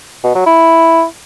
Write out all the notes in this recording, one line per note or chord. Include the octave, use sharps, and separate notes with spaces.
B2
F#3
E4